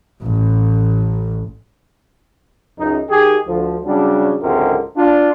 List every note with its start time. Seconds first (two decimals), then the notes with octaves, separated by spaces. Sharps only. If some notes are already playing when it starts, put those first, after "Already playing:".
0.21 A1
2.78 C#2 F#2 D#4
3.09 D#3 G4 G#4
3.47 D2 F3
3.85 C#3 F#3 G3 D4
4.40 G#1 C#2 F#2 D3 C4 A#4
4.97 D4 F4